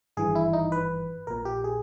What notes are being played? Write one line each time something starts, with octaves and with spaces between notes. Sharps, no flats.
G#1 G2 E3 G#4
E4
D#4
B4
A#1 A#2 A#4
G4
G#4